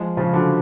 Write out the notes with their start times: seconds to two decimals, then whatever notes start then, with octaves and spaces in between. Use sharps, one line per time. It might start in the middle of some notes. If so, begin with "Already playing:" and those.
Already playing: F3 G#3
0.17 C#3 F3
0.33 D3 F#3